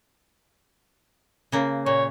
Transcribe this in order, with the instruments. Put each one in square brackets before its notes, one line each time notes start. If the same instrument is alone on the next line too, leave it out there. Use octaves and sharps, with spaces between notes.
[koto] C#3 A#3
[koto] A#2 [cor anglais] C#5